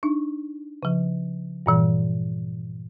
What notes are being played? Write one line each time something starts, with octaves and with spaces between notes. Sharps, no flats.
D4 D#4
C#3 F3
G2 A#2 E3 G3